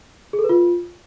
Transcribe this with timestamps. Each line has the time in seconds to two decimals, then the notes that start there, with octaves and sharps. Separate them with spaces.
0.33 G#4
0.39 A4
0.44 B4
0.49 F4